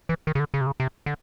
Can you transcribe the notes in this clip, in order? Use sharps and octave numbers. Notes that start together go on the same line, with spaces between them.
E3
D#3
C#3
D3
C#3
C3
C#3
C3
D3